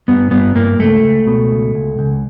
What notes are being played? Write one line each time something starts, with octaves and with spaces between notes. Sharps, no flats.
G2 B3
G2 B3
G2 A#3
C#2 A3
C#2
B2
C#2
C#2
C#2